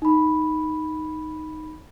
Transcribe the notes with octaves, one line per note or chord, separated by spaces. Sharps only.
D#4 B5